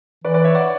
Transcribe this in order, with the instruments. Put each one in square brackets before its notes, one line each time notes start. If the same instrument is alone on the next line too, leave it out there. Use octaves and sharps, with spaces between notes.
[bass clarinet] E3 [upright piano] B4 D5
[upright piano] B4 D5
C#5 E5
D5 F#5